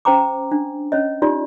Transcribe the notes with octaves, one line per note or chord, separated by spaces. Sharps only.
C#4 C5 G5 A#5 D6
D4
C#4 C#5 D#5
D#4 F4 G4 D5 C6